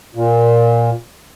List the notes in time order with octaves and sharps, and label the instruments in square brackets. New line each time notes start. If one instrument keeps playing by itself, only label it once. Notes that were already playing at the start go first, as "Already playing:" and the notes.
[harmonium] A#2